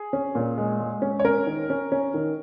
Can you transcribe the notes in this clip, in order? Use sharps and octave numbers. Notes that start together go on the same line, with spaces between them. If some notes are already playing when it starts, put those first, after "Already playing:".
Already playing: G#4
C#4
A#2
G#3
G#3
C#4
C#5
C#4 A#4
D#3
C#4
C#4
D#3